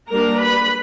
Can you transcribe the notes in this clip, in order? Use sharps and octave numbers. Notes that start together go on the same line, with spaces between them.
G3 A#3 D4 A#4 A#5
B4 B5